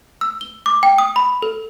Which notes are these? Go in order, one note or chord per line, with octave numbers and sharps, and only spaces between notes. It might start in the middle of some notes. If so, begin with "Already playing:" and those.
E6
G7
D6
G5
D#6
B5
A4